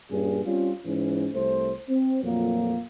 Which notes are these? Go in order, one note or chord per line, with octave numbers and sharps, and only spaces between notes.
G2 A#2 C#4 G#4
G3 C4 C#4 F4
G#2 E3 C#4
C2 A3 C5
C4
F2 A#2 F#3 A3 A#3